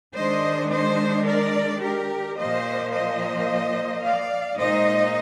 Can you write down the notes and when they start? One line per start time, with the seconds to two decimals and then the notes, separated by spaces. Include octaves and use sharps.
0.15 D#3 G#3 D4 C5 D#5
0.70 C5 D#5
1.26 A#4 D5
1.81 G4 A#4
2.37 A#2 F3 A#3 C5 D#5
2.93 C5 D#5
4.04 D5 F5
4.59 A#2 G#3 D#4 C5 D#5